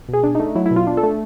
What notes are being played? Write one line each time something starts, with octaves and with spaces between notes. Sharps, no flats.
B2
G#4
D4
A3 D#4
F#3 E4
E4
B2
F4
D4
A4
A3